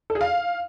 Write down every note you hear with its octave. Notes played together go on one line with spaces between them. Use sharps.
A4
G#4
F5